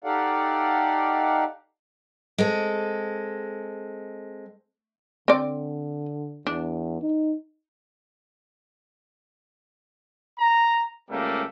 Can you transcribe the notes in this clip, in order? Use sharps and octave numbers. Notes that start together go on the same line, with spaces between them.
D#4 G4 A4 D5 F5 F#5
G#3 C4 A4
D3 C4 D5
E2 D4
D#4
A#5
C#2 C#3 G3 A3 A#3